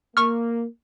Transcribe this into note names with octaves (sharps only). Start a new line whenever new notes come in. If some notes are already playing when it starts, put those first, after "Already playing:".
A#3 C#6 F6